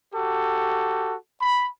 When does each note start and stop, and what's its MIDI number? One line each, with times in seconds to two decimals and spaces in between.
0.14 1.15 66
0.14 1.15 67
0.14 1.15 69
1.41 1.66 83